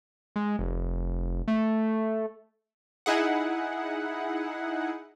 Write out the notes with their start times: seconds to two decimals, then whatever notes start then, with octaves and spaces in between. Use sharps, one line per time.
0.36 G#3
0.59 F1
1.48 A3
3.06 D#4 E4 G#4 F#5